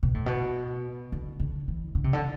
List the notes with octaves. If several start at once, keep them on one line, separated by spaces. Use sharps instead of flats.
B2
A2
B2
D3
D3
E3
D3
C3
D3